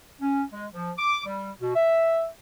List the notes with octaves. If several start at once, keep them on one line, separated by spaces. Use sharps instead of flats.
C#4
G#3
F3
D6
G3
B2
E5